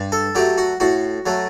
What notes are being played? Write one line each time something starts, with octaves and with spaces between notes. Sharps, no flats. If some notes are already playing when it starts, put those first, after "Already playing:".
Already playing: G2
A4
F#3 A3 G4
F#4
A2 F#4
F#3 A3